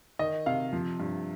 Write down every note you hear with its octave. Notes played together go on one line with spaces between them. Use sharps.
D#3 D#5
C3 F5
F3
G2